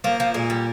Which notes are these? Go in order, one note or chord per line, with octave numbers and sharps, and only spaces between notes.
F3 A#3
F3
A#2 G#3
G3